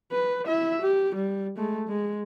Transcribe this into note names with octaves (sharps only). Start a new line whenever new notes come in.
B4
E4 E5
G4
G3
G#3 A3
G#3